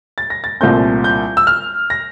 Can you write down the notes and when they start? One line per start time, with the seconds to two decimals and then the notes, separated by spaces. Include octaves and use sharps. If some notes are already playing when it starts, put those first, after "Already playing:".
0.18 A6
0.30 A#6
0.44 A6
0.61 C2 A#2 A3 C4 G6
1.04 G6
1.37 E6
1.47 F6
1.90 A#6